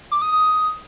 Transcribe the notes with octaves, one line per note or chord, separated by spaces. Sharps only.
D6
D#6
D#6